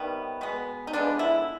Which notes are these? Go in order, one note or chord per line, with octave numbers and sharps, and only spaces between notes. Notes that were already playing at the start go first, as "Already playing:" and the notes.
Already playing: C3 D#3 G3 B3
B2 G#3 B3
D#4
D3 F3 G#3 B3 D4
E4